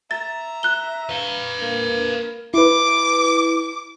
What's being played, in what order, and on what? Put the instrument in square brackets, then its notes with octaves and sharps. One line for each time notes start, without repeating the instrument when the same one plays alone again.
[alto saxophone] E5 [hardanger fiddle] A#5 [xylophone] A6
[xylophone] F#6 G7
[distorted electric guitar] B4 F5
[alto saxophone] A#3
[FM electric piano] E4 B4 [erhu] D6